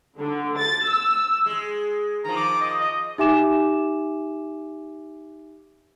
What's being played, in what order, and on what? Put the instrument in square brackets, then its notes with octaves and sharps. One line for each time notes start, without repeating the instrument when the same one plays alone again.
[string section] D3
A6
E6
[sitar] G#3
[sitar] D#3 F3 [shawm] A#5
[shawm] D6
D#5
D#5
[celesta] D#4 G4 E5 G#5 D6 E7